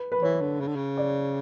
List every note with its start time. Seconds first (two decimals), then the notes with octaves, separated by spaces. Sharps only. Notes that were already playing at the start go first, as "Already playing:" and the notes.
Already playing: B4
0.12 B4
0.22 E3 C#5
0.41 D3
0.60 C#3
0.67 D3
0.76 C#3
0.97 D5